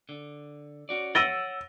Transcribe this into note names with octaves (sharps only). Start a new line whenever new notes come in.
D3
C#4 F#4 D5
C#5 F#5 E6 A6 A#6 D7 D#7 G7